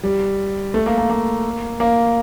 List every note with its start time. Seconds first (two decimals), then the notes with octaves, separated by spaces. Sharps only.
0.03 G3
0.74 A3
0.86 A#3
0.98 A#3
1.10 A#3
1.80 A#3